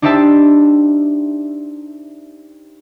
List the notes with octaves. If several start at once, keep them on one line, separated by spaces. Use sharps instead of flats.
D4 D#4 G4 C5 E5 A5